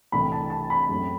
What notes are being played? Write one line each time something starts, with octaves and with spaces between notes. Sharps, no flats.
C2 C3 E3 A3 C4 B5
A5
A5
B5
F#2 F#3 A3 C4